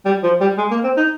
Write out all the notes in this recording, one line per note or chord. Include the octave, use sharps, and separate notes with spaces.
G3
F3
G3
G#3
A#3
C4
D#4